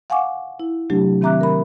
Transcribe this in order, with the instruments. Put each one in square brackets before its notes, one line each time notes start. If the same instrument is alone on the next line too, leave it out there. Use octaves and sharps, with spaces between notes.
[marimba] F5 F#5 G#5 C#6 D6
E4
C3 F#3 A3 D4 G4
D#3 C4 E5 A#5 D6 F#6
A#4 B5